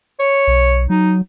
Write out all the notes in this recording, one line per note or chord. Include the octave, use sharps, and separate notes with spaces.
C#5
B1
F#3 D#4